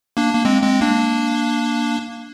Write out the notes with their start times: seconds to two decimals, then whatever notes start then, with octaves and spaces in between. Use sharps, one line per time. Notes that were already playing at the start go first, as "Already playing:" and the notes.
0.17 A#3 D4
0.34 A#3
0.45 G#3 C4
0.62 G#3 C4
0.81 A#3 D4